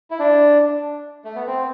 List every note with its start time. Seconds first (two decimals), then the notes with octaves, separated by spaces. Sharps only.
0.11 E4
0.20 D4
1.25 A3
1.35 B3
1.47 C4